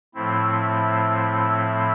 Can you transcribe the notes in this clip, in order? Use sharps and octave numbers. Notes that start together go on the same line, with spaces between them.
A2 F3 A3 C4 E4